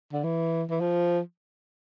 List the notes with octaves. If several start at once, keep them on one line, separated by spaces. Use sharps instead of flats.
D3
E3
E3
F3